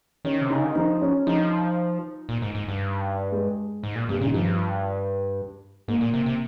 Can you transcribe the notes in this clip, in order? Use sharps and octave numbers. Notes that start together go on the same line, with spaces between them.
D#3 C#4
C3
C#3 D#4
D#3
F3 D#4
C#4
F3 D#4
A#2
G#2
G#2
G2
G#3
G#2
A#2
G2 C3
A#2 C#3
D#3
G2 F3
G#2 A#3
A#2
C3
C3